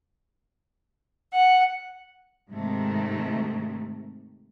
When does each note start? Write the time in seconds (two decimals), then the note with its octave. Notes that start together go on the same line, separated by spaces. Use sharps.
1.32 F#5
2.50 G#2 C3 D#3 A3